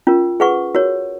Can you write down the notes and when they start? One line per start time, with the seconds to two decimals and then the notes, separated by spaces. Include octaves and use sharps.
0.07 C#4 F4 A#4
0.40 G#4 B4 F#5 C#6
0.75 F#4 A#4 C#5